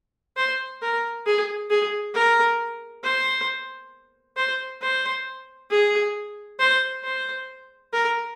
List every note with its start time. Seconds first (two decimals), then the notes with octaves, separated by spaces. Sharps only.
0.37 C5
0.82 A#4
1.26 G#4
1.70 G#4
2.15 A#4
3.03 C5
4.37 C5
4.82 C5
5.71 G#4
6.59 C5
7.04 C5
7.93 A#4